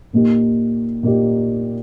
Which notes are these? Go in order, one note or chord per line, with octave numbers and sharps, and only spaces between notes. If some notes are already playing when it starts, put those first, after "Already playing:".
A#2 A#3 D#4 G4
A#2 A#3 D#4 G4